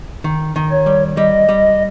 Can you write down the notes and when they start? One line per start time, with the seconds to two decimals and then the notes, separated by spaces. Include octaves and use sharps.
0.24 D#3
0.56 D#3
0.71 C#5
0.86 G3
1.17 G3 D#5
1.49 G3